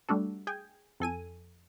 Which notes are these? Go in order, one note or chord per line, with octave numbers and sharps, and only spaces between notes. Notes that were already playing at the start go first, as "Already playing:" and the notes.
G3 A3 D4 F#4 A4
G#4 G5 G#5
F2 A4 G#5 D#7